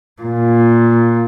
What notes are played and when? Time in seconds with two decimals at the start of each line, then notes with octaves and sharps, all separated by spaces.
0.23 A#2